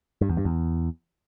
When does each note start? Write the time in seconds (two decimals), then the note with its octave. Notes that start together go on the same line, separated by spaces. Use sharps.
0.21 G2
0.29 E2
0.37 G2
0.45 E2